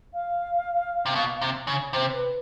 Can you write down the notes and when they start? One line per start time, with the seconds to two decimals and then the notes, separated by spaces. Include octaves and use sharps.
0.13 F5
1.06 C3
1.15 B2
1.41 C3
1.67 C#3
1.92 C3 C5
2.12 B4